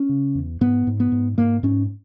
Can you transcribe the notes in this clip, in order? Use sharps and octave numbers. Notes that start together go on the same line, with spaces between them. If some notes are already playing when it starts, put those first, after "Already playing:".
Already playing: C#4
C#3
E2
G#2 B3
G#2
B3
G#2
G#2 A#3
G#2 C#4